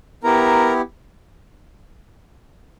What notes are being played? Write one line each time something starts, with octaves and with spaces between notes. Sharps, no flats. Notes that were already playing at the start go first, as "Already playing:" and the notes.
B3 E4 G4 A#4 A#5